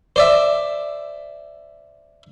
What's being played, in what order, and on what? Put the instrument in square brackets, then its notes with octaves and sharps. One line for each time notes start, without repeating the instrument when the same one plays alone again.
[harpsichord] C5 D5 E5